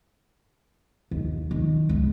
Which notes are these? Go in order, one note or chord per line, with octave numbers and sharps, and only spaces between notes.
D#2
D#3
C#2